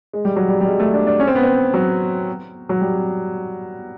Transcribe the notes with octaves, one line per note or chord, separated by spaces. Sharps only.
G#3
G3
F#3
G3
G3
G#3
A3
D4
D4
C#4
C4
B3
C4
F#3
F#3
G3